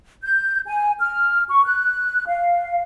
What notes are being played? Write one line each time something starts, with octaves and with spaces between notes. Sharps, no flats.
G6
G#5
F6
C#6
F#6
F5